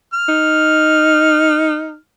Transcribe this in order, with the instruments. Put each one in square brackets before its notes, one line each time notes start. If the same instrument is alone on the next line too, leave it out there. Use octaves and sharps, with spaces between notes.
[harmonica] F6
[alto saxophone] D#4